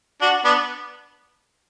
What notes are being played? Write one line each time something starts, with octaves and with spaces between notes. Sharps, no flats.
D4 F#4
B3 D4